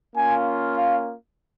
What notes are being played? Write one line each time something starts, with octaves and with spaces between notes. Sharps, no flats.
A#3 C#4 F4 G#5
F5